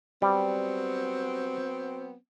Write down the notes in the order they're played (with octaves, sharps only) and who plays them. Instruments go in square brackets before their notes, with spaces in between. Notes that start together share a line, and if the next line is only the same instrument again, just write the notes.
[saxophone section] F#3 B3 C4 [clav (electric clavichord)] G3